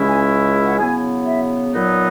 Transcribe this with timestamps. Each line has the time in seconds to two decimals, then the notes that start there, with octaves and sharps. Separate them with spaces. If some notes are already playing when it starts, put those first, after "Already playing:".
Already playing: C#2 C#3 G#3 C#4 E4
0.08 G#5
0.67 F#5
0.79 C#3 F#3 B3 E4 G#5
1.27 E5
1.74 A#2 F#3 B3 D#4